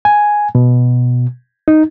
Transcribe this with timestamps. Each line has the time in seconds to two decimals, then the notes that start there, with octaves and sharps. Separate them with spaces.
0.05 G#5
0.55 B2
1.68 D#4